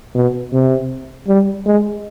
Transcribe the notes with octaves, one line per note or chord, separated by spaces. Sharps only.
B2
C3
G3
G#3